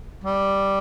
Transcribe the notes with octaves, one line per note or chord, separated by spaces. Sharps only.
G3